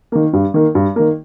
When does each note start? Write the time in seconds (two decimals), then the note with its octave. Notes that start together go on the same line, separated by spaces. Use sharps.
0.12 D#3 A#3
0.33 G2
0.54 D#3 A#3
0.75 G2
0.96 D#3 A#3